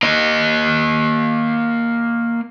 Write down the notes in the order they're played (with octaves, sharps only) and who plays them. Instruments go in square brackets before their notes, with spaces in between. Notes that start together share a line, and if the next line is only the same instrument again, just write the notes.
[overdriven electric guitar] A#3 D#5